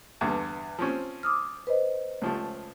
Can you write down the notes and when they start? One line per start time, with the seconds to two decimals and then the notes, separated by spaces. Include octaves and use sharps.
0.21 E2 G2 D3
0.79 F3 C4 C#4
1.23 D6 D#6 F6
1.67 B4 C5 D#5
2.21 C#2 F3 A3